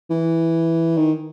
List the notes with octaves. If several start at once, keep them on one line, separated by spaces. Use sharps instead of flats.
E3
D#3